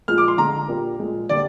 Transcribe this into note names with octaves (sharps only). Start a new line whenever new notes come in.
A#2 F3 G#3 F6
D6
C6
D3 G#3 A#5
A#2 G3 A#3
A#2 G#3
D3 G3 A#3 D5